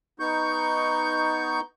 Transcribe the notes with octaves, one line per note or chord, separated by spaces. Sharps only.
B3 D#4 C#6 G6